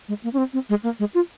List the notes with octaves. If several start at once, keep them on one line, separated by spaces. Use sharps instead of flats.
G#3
A#3
C#4
C4
C4
G#3
A#3
G#3
F4